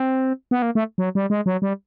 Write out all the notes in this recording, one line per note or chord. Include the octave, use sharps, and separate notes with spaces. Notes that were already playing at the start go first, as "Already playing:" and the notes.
Already playing: C4
B3
A#3
A3
F#3
G3
G#3
F#3
G3